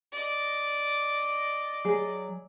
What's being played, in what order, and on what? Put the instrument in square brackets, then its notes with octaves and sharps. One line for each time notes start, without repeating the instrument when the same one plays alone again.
[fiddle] D5 D#5
[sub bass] F#3 [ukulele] G#4